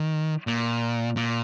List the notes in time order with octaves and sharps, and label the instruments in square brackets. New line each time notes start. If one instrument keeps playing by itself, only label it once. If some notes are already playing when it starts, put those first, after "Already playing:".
Already playing: [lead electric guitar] D#3
A#2
A#2